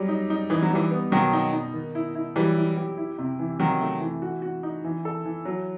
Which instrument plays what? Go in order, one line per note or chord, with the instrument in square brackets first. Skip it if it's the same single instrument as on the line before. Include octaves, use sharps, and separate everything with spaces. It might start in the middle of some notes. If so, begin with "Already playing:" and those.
Already playing: [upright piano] F#3 G3
D#4
D#4
[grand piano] E3 [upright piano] D#4
[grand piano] F#3
[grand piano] E3 [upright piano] G3
[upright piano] B3
[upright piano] B2 [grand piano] D#3 F#3
[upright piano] D#4
D#4
D#3
E4
E4
[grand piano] E3 G3 [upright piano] F#3
[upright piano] E4
G4
E4
C3
E3
[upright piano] C3 [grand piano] D#3 F#3
[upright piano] A3
E3
F#4
F#4
D#4
E3
A4
E3
F#3